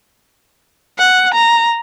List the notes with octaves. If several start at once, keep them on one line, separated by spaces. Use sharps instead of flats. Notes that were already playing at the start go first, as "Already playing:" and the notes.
F#5
A#5